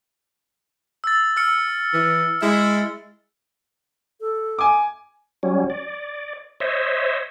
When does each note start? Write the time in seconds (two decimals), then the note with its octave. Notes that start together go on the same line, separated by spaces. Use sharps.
1.04 E6 A6
1.36 E6 F6 C#7
1.93 E3
2.41 G#3 E4
4.20 A4
4.59 G#5 D6
5.43 F#3 G3 C#4
5.70 D5
6.60 C5 C#5 D#5 E5